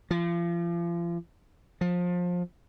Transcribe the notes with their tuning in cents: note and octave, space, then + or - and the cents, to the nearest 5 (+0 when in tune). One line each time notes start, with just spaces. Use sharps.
F3 -35
F3 +25